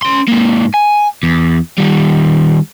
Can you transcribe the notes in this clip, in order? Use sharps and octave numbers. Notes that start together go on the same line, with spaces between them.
C#4 C6
G#2 A#3
G#5
E2
D#3 G3